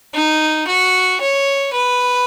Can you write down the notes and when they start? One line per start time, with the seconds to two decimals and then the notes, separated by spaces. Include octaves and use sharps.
0.14 D#4
0.67 F#4
1.21 C#5
1.73 B4